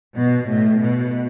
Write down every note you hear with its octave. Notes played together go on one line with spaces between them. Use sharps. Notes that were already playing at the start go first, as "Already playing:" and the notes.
B2
A2
B2